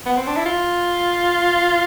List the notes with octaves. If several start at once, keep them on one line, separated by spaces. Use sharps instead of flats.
B3
C4
D4
E4
F4